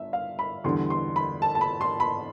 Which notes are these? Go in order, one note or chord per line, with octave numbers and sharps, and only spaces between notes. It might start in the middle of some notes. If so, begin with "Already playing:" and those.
Already playing: G1 E5
F5
B5
E2 D3 G3 C6
C6
B5
A5
A5
B5
C6
B5